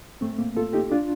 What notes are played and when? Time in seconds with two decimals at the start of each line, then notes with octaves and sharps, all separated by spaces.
0.21 A2 A3 C4
0.33 A3
0.38 A#3
0.56 F4 A4
0.73 D#4 G4
0.92 D4 F4